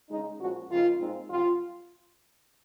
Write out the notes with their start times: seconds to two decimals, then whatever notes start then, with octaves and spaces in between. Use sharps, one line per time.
0.09 C#3 G#3 D#4
0.39 A#2 F3 G#3 C#4 F#4
0.69 F2 C#3 F3 A#3 D#4 F4
0.99 A#2 G#3 C4 D#4
1.29 F2 C3 F#3 C4 F4